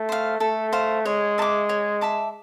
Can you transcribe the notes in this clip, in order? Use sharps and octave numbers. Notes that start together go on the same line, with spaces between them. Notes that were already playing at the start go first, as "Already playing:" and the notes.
Already playing: A3
C5 F5
A3 A4
C5 F5
G#3 C#5
E5 A5 D6
C#5
E5 A5 D6